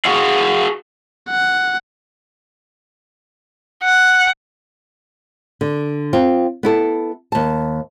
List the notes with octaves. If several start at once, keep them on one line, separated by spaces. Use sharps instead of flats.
F#4 G#4 F5 F#5
F#5
F#5
D3
C4 F4
B3 E4 A4
D#2 A5